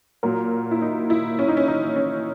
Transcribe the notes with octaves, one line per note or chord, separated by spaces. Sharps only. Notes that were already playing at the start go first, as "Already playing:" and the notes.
A#2 F#3 A#4
E4
D#4
E4
C#4
D#4
C#4
D#4
C#4